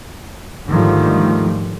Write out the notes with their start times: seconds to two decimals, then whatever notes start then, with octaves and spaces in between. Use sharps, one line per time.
0.68 G#2 D3 D#3 F3 G3 A3